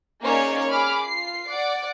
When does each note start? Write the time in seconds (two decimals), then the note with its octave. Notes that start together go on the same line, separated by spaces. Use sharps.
0.22 A#3 C#4 D#4 G#4 C#5 D5
0.69 G#4 B5 D6 F6
1.04 F4 C7
1.49 D5 F#5 D6